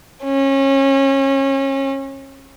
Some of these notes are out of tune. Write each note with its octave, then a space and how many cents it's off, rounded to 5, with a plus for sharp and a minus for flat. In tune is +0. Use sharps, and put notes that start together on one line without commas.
C#4 -30